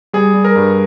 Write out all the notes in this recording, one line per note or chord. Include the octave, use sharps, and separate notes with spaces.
G3 G#4
G3
A#4
G2